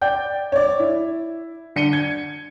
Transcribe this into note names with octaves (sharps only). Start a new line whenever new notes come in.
D5 G5 G6
C#5 D5
E4
D3 C#7 D#7 G7
G#6